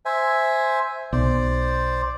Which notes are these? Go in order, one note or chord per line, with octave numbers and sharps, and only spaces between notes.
C5 E5 G#5
B1 C5 D5